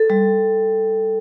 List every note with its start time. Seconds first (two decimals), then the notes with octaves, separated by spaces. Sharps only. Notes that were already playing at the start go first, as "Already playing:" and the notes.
Already playing: A4
0.10 G3